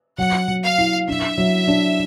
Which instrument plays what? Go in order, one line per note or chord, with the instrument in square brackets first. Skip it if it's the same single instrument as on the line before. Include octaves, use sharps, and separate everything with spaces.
[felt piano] F#3 [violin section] F#5
[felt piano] F#3
[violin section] F5
[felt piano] E4
[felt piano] D4 [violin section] E5
[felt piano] F#3
D4